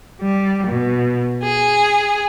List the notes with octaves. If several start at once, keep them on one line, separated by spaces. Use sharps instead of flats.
G3
B2
G#4